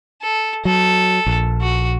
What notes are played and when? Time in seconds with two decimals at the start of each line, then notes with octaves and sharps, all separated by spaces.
0.22 A4
0.65 F#3 A4
1.26 A#1
1.62 F#4